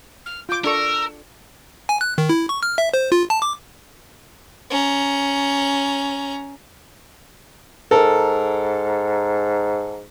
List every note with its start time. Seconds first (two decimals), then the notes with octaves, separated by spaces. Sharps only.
0.25 F6
0.49 F4 D6 G6
0.64 D4 A4 A#4 C#6 E6
1.89 G#5
2.01 F#6
2.18 D#3
2.29 E4
2.49 C#6
2.63 F6
2.78 E5
2.94 C5
3.12 F4
3.30 A5
3.42 D6
4.70 C#4 A#5
7.91 G#2 A4 A#4